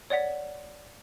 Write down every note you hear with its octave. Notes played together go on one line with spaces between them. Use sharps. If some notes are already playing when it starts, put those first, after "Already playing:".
C#5 D5 F#5 B6